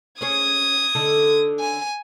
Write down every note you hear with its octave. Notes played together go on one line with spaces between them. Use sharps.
C#4 G#4 C#5 D#6 G#6
D3 D#4 A4
G#5